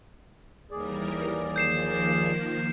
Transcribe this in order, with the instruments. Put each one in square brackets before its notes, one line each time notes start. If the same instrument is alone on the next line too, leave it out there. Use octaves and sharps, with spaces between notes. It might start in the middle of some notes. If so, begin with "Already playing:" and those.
[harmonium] D#2 G#4 D5 [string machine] E3 G3 A#4
[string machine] D#3 F3 A#3 [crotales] G6 C7 E7